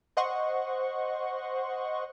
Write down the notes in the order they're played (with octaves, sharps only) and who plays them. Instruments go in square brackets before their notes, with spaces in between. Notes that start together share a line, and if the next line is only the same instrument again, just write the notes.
[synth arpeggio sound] C5 D#5 F#5 C6 C#6